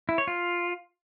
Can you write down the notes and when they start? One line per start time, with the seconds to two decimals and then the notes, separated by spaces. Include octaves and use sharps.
0.09 E4
0.18 C#5
0.27 F4